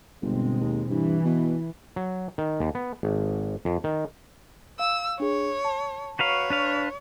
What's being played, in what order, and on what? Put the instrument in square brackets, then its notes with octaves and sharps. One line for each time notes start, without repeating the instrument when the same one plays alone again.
[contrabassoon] G1 [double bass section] B2 G#3 C4
[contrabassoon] D#2
[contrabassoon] G2 [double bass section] E3
[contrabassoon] B2
[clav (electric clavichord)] F#3
D#3
D#2
B3
G#1
F2
D#3
[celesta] F5 [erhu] E6
[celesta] D4 G#4 [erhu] C#5
[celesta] A5
[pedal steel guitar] F#4 B4 F5 [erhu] C#5 [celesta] A#5 C#6
[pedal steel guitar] D4 B4 F5